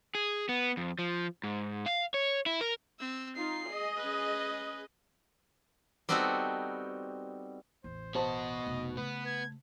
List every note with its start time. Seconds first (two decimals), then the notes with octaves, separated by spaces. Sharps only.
0.15 G#4
0.49 B3
0.77 F2
0.99 F3
1.44 G#2
1.86 F5
2.14 C#5
2.46 E4
2.61 A#4
3.00 C4 E6
3.36 D#4 F4 C7
3.67 G#4 D#5
3.97 C#4 B4
6.09 G3 B3 C4 D#4 F#4 A4
7.84 A1 E2 C5
8.15 B2 F#4 C5 D#5 A5
8.66 F1 B1
8.97 C#3 A3 B3 B4
9.26 G#6